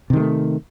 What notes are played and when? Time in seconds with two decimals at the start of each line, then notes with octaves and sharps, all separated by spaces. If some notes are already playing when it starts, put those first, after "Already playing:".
0.10 C3
0.13 D#3
0.17 G#3
0.20 A3